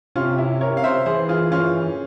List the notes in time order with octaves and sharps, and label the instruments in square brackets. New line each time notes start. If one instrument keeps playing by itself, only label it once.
[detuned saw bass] C3 [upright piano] C#4 F4
[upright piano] E4
A#4 C#5
F5
C5 E5
[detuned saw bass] E3 [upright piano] G#4 C5
[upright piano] F4 G#4
C#4 F4